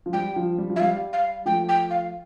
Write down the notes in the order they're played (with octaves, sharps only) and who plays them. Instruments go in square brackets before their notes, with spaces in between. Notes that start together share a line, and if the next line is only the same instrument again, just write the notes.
[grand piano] F3
[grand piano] G3 [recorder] G5
[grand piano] F3
G3
F3
[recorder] E5
[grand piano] G3 [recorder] F5
[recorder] F5
[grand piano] F3 A3 [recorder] G5
[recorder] G5
F5